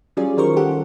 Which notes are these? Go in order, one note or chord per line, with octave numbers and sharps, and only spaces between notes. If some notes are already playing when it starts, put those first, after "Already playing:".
F#3 G3 C#4 F4 G#4 D5
D#3 G3 A#4 C5 C#6
G4 A4 F#5